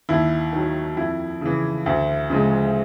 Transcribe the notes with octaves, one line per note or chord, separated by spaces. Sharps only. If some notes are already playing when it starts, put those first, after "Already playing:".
D#2 E4
D#3 F#3
F2 E4
C#3 E3
D2
C#3 F3 G#3